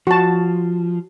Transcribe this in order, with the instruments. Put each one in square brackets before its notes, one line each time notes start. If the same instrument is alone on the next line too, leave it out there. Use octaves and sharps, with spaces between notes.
[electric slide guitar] F3 [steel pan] F#4 A5